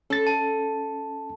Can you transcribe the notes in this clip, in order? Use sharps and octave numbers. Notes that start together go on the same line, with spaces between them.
C#4 A4 A6
A5